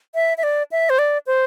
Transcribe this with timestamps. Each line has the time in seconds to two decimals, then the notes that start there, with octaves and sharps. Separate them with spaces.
0.15 E5
0.38 E5
0.43 D5
0.72 E5
0.90 C5
0.99 D5
1.27 C5